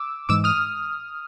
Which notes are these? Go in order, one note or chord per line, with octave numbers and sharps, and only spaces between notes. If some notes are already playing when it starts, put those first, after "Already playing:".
Already playing: D6 E6
G#2 E3 G#3 D6 E6
D#6 F6